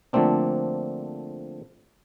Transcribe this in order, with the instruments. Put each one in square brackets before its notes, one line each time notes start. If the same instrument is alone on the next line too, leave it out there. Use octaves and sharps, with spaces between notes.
[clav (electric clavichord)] D3 F3 A3 A#3 C4 D4